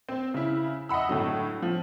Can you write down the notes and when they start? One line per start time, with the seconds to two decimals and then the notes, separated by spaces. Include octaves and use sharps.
0.09 C4
0.34 C#3 E4
0.89 D#5 E5 F#5 B5 E6
1.09 A2 D3 F#3
1.62 F3